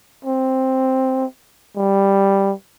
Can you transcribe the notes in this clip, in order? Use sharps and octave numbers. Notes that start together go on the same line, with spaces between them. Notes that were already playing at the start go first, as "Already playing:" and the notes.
C4
G3